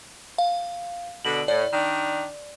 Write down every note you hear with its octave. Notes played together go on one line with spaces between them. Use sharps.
F5
B2 D3 F#7
A2 D5
D#3 D4